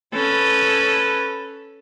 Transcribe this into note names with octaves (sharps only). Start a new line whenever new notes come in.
C#4 A4 B4